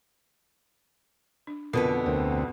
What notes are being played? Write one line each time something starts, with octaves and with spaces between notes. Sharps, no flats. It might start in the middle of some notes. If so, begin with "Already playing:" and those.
D4
F2 B2 D3 E3 B3 A#4 B4
D2 C4 A#4